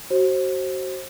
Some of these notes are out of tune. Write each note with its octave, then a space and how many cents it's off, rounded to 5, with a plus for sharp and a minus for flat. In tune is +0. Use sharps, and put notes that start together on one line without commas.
F#4 +25 C5 +25